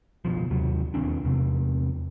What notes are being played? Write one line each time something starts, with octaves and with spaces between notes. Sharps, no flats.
F#1 B2 F3
D#2 C3 F#3
E1 D#2 C4 D4
E2 C3 C4